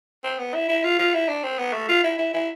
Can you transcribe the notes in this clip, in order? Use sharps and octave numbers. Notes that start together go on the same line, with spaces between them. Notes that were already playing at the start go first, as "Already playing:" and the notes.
C4
B3
E4
E4
F4
F4
E4
D4
C4
B3
A3
F4
E4
E4
E4